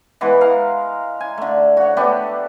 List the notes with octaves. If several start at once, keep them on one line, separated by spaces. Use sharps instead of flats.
E3 G#3 B3 B4
F5 A#5
G#5
D3 A3
F#4 C#5
A3 B3 D4 G4